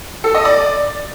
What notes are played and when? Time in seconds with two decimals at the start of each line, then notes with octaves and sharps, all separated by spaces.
0.24 A4
0.35 D#5
0.45 D5